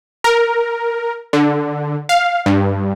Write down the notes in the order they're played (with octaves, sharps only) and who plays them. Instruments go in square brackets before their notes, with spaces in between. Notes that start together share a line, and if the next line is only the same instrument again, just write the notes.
[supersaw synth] A#4
D3
F5
G2